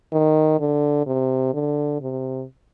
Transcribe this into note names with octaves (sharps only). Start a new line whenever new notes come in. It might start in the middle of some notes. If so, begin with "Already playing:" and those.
D#3
D3
C3
D3
C3